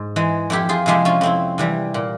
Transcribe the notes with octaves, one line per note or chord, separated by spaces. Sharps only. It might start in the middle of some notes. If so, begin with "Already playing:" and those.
Already playing: G#2
E3 G#3
F2 E4 G4
F4 G#4
C3 F3 G#3 E4 G4
C#4 F4
F2 C4 E4
C3 E3 G3
A#2